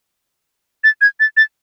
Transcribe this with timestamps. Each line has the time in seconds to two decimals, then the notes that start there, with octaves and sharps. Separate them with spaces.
0.84 A6
1.01 G#6
1.20 A6
1.37 A6